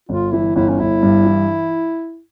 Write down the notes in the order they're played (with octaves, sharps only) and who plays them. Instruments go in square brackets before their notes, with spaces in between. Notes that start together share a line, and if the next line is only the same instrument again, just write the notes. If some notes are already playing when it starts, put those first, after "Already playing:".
[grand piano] G1 [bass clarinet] F4
[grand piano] E3 [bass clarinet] E4
[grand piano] G1 [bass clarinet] E4
[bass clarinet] C#4
[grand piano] G1 [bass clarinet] E4
[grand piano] G2
E3